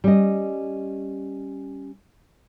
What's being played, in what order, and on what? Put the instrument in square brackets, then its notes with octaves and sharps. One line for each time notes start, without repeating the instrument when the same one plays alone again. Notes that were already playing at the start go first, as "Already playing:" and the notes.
[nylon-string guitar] G3 C#4 D#5